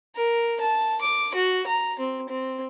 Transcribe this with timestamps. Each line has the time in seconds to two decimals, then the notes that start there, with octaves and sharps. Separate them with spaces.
0.16 A#4
0.60 A5
1.01 D6
1.35 F#4
1.67 A#5
1.99 C4
2.28 C4